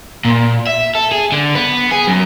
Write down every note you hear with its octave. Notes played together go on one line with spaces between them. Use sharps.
A#2
E5
A4
G#4
D3
B3
G#4
F#2